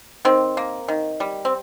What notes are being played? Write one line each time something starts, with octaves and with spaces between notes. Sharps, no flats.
D#3 C4
A#3
D#3
G3
C4